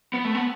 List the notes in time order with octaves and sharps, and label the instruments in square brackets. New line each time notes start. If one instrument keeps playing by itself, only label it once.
[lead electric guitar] B3
A3
B3